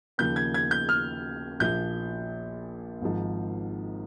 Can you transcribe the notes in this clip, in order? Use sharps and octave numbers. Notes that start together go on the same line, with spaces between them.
D#2 C#3 F3 G6
G#6
G#6
G6
F6
A#1 A#2 F3 G6
G#1 G#2 F3